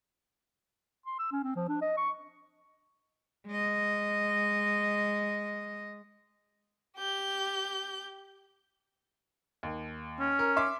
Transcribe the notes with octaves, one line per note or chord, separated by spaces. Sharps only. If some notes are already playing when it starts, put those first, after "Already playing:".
C6
E6
C#4
C4
F3
D4
D#5
C#6
G#3 D#5
G4 G6
D#2
C#4
A#4
E5 C6 D6